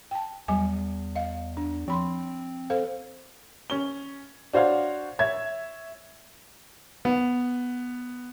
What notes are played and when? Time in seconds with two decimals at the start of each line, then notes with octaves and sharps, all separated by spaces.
0.11 G5 A5
0.48 E2 F#3 G3 G#5
1.15 D#5 F5
1.57 D4
1.88 F3 C4 B5 C6
2.70 A4 C5 F5
3.70 C#4 G7
4.53 D4 F#4 C5 C#5 F5
5.19 C#5 E5 G#6
7.05 B3